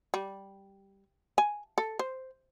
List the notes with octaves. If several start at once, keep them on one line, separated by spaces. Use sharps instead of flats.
G3
G#5
A4
C5